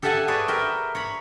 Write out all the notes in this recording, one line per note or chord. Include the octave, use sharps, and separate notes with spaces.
G4 A4 E5 F#5 G#5 A5
G#4 B4 C#5 D5
A#4 E5 G5
C#5 A#5 B5